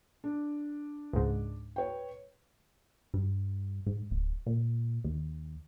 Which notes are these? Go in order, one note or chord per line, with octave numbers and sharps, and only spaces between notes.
D4
C#2 G#2
B4 C#5 G5
G2
G#2
D1
A#2
D#2